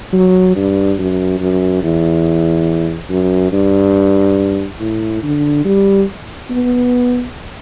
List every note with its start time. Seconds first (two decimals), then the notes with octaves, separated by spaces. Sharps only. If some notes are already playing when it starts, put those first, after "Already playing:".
0.13 F#3
0.56 G2
0.99 F#2
1.40 F#2
1.83 E2
3.10 F#2
3.52 G2
4.80 A2
5.23 D3
5.65 G3
6.50 B3